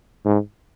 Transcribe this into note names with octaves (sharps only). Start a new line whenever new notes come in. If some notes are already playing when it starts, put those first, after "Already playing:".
G#2